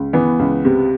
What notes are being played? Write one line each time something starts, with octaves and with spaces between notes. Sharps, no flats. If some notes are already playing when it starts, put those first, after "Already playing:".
Already playing: C#2
E3 B3
C#2
C3